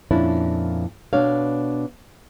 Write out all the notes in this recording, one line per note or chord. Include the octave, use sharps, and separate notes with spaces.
F2 A#2 C#4 D4 E4
B2 D4 C#5 F5